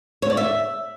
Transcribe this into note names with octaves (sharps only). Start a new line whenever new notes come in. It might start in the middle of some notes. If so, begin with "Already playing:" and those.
C#5
D5
E5